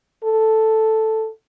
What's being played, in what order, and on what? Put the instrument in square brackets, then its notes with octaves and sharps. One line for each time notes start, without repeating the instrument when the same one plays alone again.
[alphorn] A4